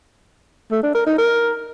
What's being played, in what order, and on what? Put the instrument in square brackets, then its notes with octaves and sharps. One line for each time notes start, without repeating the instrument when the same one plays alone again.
[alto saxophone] A3
D4
A#4
D#4
A#4